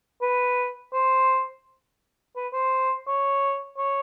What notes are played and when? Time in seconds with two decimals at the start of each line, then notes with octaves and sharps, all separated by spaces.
0.22 B4
0.93 C5
2.36 B4
2.53 C5
3.07 C#5
3.78 C#5